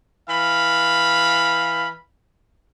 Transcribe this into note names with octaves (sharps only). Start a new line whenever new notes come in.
E3 F5 B5